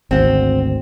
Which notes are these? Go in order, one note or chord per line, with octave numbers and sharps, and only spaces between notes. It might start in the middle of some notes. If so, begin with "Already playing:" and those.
G#1 D2 C4 F#5